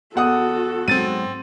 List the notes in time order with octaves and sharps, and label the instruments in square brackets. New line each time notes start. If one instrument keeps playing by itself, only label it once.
[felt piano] E2 F#5 D#6 [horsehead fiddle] F#4 A4
[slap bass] G#2 F#3 [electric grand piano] C4 A6 D#7